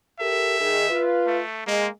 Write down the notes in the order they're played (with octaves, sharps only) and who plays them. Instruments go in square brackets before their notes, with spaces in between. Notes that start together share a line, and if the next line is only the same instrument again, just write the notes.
[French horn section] G4 A4 A#4 [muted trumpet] E5
[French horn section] D#3 G#4
F4 B4
[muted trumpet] A3
[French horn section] G#3 [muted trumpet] A#3